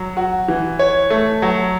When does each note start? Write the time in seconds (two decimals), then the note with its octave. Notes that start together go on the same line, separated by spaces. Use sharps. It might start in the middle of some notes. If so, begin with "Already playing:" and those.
Already playing: F#3
0.17 F#4
0.48 E3
0.79 C#5
1.10 A3
1.42 F#3